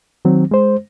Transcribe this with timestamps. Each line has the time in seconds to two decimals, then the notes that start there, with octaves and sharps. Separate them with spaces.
0.25 D#3 F#3 C4
0.51 G#3 C5